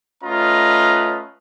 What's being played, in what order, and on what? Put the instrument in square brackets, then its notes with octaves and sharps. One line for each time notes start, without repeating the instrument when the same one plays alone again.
[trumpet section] A3 C#4 F4 B4 D#5 A#5